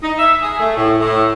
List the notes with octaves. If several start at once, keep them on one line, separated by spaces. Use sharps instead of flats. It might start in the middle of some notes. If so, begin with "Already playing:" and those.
D#4
E5
G#4
A3
A2
A2